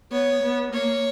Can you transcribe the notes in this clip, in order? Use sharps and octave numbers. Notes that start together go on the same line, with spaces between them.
B3 C#5
B3
A#3 C#5